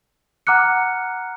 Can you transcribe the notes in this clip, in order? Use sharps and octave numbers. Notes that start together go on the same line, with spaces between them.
F#5 A#5 D6 F6 F#6 C#7